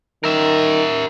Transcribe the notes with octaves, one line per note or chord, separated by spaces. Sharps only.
D#3 A#4 E5